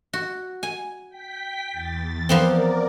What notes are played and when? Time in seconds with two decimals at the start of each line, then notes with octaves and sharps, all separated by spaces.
0.13 F#4
0.63 G#5
1.09 G5 B6
1.71 E2 A6
2.29 F3 B3 C4 A#4 D5